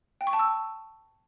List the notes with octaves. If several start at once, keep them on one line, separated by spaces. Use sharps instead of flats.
G5
C#6
A5
E6